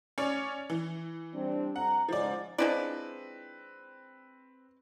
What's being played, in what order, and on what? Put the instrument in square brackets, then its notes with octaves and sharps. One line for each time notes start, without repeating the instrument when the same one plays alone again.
[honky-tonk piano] C#4 C#5 D5
E3
[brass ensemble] G3 C4 D4
[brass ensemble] F2 A#5 [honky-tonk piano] F#5
[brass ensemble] C#2 G#2 [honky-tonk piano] F3 D5
[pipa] F3 G#3 D5 [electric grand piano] C4 B4 [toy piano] D4 E4